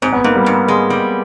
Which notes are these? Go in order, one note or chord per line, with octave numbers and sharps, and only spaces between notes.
G#2 C4
B3
G#2 A#3
G3
G#2
G#3
G3